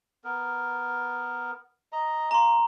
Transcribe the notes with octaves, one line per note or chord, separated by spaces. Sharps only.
B3 A#4
D#5 A#5
A#3 A#5 C6